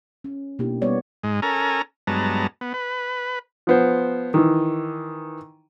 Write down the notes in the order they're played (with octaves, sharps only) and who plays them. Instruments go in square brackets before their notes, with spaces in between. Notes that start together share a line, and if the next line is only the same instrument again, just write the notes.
[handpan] C#4
B2 A#3 D4 E4 G4
G3 B3 C#5 D5
[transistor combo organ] G#2 G#3
C#4 A4 A#4 G#5 A#5
G2 F#3 G#3 B3 A5 A#5
B3
B4
[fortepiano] F3 B3 C5
D#3 E3